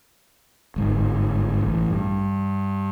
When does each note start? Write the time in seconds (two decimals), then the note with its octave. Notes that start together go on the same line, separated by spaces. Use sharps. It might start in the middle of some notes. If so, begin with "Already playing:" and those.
0.76 G1 G#2
1.61 A1
1.90 G2